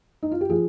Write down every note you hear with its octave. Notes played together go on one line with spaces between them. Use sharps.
D#4
F4
G4
F3 F4 G#4